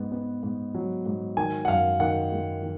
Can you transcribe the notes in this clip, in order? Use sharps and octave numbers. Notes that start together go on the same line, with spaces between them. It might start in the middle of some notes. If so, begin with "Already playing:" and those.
Already playing: G#2 B3
B3
G#2
F#3
G#2
D#3 G#5
F#5
F#2 F5
D#3 F#5
G#3
D#3